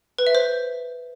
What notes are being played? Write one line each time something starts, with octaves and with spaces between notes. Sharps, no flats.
B4
E5
C5